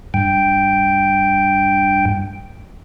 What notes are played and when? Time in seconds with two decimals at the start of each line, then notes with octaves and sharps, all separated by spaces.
0.14 G2 G5